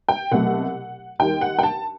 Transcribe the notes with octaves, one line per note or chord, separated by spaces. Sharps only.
G5
C2 B2 F#3 A3 F#5
D#2 D#3 G3 G5
F#5
G5
A5